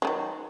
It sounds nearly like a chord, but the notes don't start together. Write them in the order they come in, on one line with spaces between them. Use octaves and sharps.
G#3 D#3 F#3